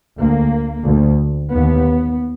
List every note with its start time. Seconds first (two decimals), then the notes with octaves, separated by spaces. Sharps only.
0.18 D2 A#3
0.86 D2
1.52 D#2 B3